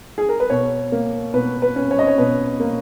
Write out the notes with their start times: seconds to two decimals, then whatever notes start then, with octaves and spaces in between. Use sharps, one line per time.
0.18 G#4
0.29 A#4
0.40 B4
0.50 B2 C#5
0.92 A#3
1.33 B2 B4
1.62 B4
1.76 C#4
1.91 C#5
1.99 D#5
2.07 C#5
2.18 B2 B4
2.60 A#3